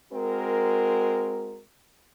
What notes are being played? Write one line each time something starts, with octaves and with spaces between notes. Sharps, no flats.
G#3 C4 F#4 A#4